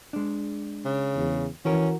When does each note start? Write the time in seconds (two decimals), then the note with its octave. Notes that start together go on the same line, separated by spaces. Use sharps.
0.13 G#3 D4
0.85 C#3
1.16 E2
1.65 E3 C#4 F#4 A#4